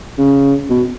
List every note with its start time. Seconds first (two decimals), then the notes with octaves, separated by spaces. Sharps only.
0.18 C#3
0.69 B2